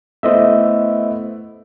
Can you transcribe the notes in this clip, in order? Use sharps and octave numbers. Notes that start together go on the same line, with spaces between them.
A3 B3 E4 C5 D#5 E5